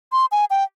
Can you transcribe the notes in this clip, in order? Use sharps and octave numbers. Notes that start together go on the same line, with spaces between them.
C6
G#5
G5